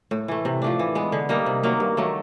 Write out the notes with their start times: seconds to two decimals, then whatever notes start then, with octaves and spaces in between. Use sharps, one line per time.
0.11 A2
0.28 E3 A3
0.45 C3
0.62 F3 A3 D4
0.79 E3
0.95 G#3 B3
1.12 D3
1.29 G3 A#3 D#4
1.46 C3
1.63 D#3 F#3 A#3
1.80 G2
1.97 D#3 F#3 A3